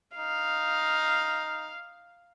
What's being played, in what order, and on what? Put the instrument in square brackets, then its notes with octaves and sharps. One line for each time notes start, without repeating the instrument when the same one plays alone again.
[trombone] D#4 [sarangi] F5